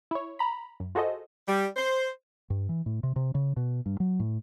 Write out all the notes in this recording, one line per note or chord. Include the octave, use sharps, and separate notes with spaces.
E4 C#5
A#5 B5
F#2
F4 F#4 G#4 A4 C5 D#5
G3
C5
G2
E3
A2
C3
C3
C#3
B2
G2
F#3
A2